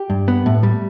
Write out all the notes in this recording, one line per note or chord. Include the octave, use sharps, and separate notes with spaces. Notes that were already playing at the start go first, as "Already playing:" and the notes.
Already playing: G4
G2
B3
A2
G3